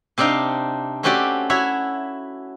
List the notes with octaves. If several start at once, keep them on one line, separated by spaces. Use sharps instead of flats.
C3 C4 D4 D#4 F5
A3 C4 C#4 F#4 G4 D5
E4 F#4 C#5 E5